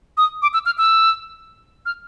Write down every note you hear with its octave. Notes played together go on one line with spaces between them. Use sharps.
D#6
D6
E6
F6
E6
F6